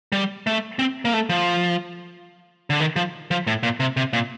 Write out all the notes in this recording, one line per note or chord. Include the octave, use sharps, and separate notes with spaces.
G3
A3
C4
A#3
A3
F3
D3
D#3
F3
F3
A2
A#2
C3
C3
A#2